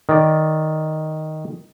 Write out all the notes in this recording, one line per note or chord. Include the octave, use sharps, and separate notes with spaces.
D#3 D5